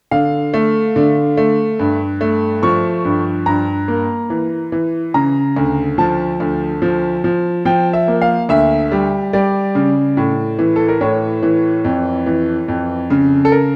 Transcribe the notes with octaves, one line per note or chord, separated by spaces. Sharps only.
D3 F5
A3
D3
A3
G2
A3
F3 C#6
G2
G2 A#5
A#3
E3
E3
C#3 A#5
D2
F3 A5
D2
F3
F3
F3 G5
E5
A#3
F5
D2 E5
G3
G3 D5
C#3
A2
E3
A4
A#4
A2 C#5
E3
F2
E3
F2
C#3
A4
A#4